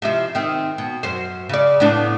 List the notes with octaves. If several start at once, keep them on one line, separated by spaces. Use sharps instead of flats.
C3 F3 E4
D#3 C4
B2
F#2 C5
C#3 D5
A2 B3 D4